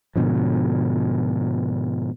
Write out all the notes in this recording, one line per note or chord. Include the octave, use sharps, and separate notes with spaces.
G#2 B2 D3 F3